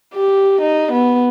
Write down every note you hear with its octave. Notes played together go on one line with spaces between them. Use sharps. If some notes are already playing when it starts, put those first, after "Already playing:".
G4
D#4
B3